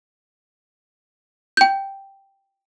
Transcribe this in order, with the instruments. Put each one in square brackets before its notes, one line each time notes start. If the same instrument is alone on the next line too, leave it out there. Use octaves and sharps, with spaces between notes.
[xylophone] G5 G6